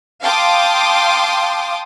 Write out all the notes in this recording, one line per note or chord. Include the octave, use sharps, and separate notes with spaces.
F5 G5 A5 C6 D6 D#6